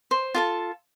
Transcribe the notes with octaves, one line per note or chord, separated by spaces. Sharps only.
C5
F4 A4 A5